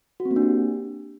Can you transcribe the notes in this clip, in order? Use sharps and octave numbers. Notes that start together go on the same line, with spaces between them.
F#4
C4
A#3
D4
G4